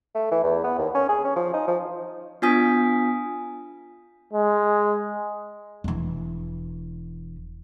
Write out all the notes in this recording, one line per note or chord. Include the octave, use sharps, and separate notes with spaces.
A3
E3
E2
B3
D#2
C#4
G#4
C#4
F3
D#4
F3
B3 D4 F4 G#5 D#6 B6
G#3
E1 E3